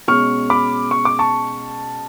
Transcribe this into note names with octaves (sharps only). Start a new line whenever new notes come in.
B2 G#3 C#4 C#6 F6
B5 D6
C#6
D6
A5 C#6